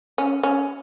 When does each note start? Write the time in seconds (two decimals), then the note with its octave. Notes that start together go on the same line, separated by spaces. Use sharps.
0.18 C#4
0.43 C#4